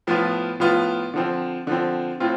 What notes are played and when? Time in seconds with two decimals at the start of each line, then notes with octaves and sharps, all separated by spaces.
0.07 A2 F3 B3 F4
0.60 A2 F3 B3 F4
1.14 D3 F3 C4
1.67 D3 F3 C4
2.20 A2 C4 F4